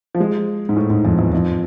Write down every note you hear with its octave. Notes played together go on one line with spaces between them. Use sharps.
F3
G#3
G#2
A2
G#2
F2
E2
F2